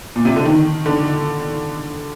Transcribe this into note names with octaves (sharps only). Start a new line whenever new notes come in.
A#2
C3
D3
D#3
D3